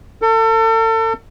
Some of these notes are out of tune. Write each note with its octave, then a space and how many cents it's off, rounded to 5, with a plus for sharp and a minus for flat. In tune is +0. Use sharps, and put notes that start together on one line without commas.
A4 +35